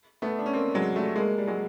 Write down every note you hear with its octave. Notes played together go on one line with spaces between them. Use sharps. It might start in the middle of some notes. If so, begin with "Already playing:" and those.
A3 B3
D4
C#4
A#3 C4
F#3 G#3
G3 A3
G#3 A#3
G3
F#3 G#3